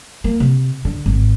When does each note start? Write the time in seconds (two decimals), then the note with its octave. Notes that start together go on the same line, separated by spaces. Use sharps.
0.24 A#3
0.40 C3
0.85 D3
1.06 G#1